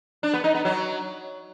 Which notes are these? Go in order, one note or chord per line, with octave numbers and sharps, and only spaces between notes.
D4
B3
D#4
B3
F#3